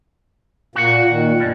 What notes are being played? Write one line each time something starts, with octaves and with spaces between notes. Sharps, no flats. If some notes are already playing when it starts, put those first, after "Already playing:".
A#2 A#3 F#4 F#5
A#2 D#3
E2 G2 B2